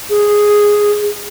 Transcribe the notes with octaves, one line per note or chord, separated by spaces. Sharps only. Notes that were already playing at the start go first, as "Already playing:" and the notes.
G#4